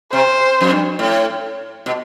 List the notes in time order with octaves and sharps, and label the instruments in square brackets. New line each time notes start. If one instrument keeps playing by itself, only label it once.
[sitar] C3 [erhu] C5
[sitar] F2
G2
A2
B2